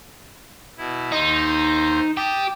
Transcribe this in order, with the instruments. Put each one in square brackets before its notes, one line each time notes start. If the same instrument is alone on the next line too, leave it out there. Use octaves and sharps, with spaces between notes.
[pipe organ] B2 E4
[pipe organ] D#2 C5 [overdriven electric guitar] D#4
[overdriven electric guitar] G4 [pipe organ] A5 D#6